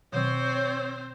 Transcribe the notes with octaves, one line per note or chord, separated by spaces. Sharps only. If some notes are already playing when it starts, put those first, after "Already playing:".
B2 D#3 F#3 C4 C5 C#5